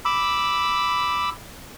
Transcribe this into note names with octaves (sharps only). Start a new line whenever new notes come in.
B5 D6 E6